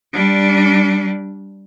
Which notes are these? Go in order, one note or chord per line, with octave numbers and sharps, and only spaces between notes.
G3 D4